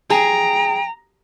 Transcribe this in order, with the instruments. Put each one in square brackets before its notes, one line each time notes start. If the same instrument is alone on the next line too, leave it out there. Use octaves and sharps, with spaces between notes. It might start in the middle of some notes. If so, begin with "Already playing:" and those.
[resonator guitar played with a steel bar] G#4 [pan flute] G5 [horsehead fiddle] A#5